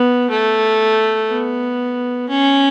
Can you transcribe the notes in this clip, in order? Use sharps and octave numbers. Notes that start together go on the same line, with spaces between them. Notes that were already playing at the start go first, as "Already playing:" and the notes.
Already playing: B3
A3
B3
C#4